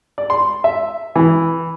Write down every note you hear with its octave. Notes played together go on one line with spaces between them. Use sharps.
D5
C6
E5
E3